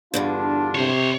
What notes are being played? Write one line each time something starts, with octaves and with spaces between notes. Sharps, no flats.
E2 G2 D3 D4 F4
C3 C5 C#5